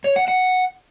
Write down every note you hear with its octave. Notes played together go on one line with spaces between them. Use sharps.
C#5
F#5
F#5